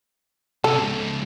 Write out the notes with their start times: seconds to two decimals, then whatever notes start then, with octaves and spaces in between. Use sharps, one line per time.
0.64 C3 C#4 A4
0.78 G#2 C#3